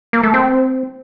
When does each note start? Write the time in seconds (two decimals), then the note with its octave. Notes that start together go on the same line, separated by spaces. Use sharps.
0.13 A#3
0.23 A3
0.34 C4